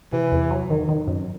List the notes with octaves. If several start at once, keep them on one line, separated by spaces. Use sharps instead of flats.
C3 E3
E2
F#3
D#3
D#3
F#2